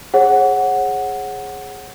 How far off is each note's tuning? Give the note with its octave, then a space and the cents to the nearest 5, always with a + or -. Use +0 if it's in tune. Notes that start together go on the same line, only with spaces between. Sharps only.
G#4 +0 C#5 -35 F#5 +0